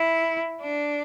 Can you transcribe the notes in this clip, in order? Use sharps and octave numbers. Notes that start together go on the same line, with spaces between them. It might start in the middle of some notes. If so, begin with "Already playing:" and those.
Already playing: E4
D4